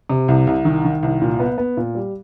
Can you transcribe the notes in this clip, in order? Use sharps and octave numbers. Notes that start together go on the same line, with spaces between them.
C3
C2
C2
D#3
D#3
C2
A#2
B3
B3
A#2
G3